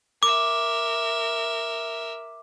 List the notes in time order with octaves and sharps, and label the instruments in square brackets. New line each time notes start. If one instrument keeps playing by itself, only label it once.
[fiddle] A#4 E5 [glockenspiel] D6